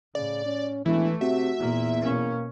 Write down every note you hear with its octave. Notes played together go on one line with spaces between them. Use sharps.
A2 C#3 D5
C#4
E1 E3 A3 E4
C3 F#4 E5
E2 A#2 A#3
B2 A#3 C#4